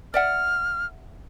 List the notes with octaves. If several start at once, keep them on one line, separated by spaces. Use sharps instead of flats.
D5 E5 F#5 F6